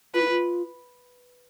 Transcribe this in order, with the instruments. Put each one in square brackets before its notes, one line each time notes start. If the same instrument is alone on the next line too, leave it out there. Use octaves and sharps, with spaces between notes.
[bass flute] F4 [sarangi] B4
[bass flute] E4
F4